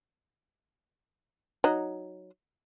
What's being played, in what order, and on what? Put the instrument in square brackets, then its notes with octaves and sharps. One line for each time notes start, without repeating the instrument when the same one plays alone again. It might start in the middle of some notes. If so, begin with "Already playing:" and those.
[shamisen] F#3 D#4